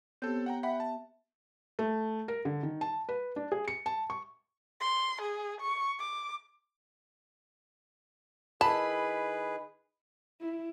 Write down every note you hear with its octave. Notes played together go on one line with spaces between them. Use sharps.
B3 C4 G4 A4 C#5 G6
F#5 G5 A#5
E5 F#5 G5 B5
A5
A3
A#4
D3
D#3
A5
B4
D4
G#4
C#7
A5
C#6
C6
G#4
C#6
D6
D#3 E4 G#4 B4 A5 B5
E4